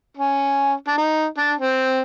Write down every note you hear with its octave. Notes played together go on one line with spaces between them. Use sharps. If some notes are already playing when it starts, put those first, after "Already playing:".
C#4
D4
D#4
D4
C4